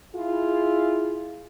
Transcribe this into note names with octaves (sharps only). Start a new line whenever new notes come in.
E4 F4 G#4